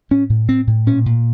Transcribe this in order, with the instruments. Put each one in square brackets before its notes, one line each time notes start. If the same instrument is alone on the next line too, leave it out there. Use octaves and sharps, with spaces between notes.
[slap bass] A2 C#4
A2
A2 C4
A2
A#2 C#4
A#2